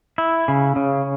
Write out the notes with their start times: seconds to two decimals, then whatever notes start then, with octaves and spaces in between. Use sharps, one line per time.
0.18 E4
0.48 C#3
0.76 C#3